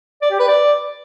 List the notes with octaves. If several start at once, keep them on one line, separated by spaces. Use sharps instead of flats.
D5
G4
B4
D5